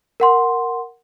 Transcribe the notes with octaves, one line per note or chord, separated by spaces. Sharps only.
A#4 F#5 C6